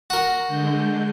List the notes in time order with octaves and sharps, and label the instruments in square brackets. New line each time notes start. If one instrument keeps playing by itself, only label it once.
[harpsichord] F#4 A#4
[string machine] D3 G#3 G6